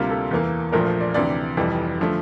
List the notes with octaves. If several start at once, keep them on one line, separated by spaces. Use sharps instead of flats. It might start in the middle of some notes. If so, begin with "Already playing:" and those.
Already playing: D2 C3 G3 A#3 F4
A4
E2 E3 A#3
A#1 A#2 F3 A3 A#4
C5
D5
D2 C3 E3 D5
F1 F2 E3 G3
D3 F3 A3